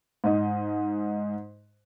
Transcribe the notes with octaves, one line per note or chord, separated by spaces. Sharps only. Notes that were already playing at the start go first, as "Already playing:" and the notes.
G#2 D#5